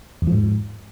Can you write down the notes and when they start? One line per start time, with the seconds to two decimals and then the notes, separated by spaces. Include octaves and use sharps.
0.22 E2
0.27 F3
0.32 G#2